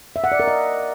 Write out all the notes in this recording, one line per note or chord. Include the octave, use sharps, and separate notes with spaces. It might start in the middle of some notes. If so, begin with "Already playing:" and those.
E5
F#5
D5
A#4
D#5